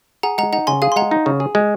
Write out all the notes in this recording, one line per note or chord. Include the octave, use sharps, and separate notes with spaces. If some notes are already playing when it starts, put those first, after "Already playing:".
G#4 F#5 A#5
G#3 F#5 A#5
D#4 F#5 A#5
C#3 G#5 C6
G#4 F5 G#5
C6
G#3 F#5 A#5
D#4
C#3
G#4
G#3